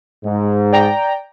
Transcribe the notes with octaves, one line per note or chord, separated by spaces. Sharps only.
G#2
D5 G5 A#5